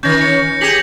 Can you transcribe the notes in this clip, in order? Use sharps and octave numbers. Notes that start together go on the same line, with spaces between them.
D#3 C#4 G6 A#6
C#7
G4 G#4 G#6 B6 F#7